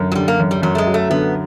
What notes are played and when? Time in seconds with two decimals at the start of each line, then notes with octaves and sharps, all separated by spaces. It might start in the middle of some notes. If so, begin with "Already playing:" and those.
Already playing: F#2 D3
0.12 F#3
0.15 D3 G3
0.28 A#3
0.39 F#2
0.51 G3
0.62 F#2 F#3
0.75 A3
0.78 G#3
0.86 F#3
0.94 A3
1.10 D3 B3